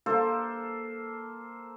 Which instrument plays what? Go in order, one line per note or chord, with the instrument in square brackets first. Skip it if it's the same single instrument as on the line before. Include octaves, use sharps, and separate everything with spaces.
[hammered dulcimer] A#3 A4 C5